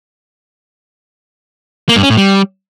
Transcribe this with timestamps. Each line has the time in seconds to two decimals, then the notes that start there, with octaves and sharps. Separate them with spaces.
1.89 A#3
1.96 G2
2.03 C#4
2.10 A2
2.17 G3